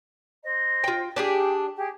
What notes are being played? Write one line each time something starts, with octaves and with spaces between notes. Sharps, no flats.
C5 D#5
F4 G5
D4 G4 G#4 G5
G4 G#4